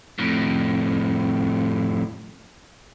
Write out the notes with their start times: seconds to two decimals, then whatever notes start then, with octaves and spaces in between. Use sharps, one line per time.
0.19 F2 A2